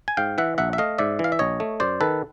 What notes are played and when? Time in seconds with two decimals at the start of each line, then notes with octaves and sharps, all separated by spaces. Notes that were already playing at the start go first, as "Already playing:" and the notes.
0.08 G#5
0.17 G#2 F5 G5
0.38 E3 E5 F#5
0.58 A#1 E5 F#5
0.73 E5
0.78 A3 D#5 F5
0.98 G#2 D5 E5
1.19 E3
1.24 F5
1.32 E5
1.39 A#1 C#5 D#5
1.60 A3
1.80 F#2 C5 D5
2.01 D#3 A4 B4